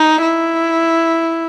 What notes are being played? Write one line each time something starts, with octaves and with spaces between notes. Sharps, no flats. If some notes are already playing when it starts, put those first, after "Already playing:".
Already playing: D#4
E4